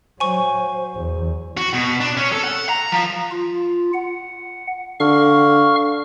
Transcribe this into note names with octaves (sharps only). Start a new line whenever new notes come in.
F#3 C5 G#5 C#6
E2
F#4
B2
D4
C#4
A4
F#5
A#5
F3
F4
F#5
D3 F5 C#6 F6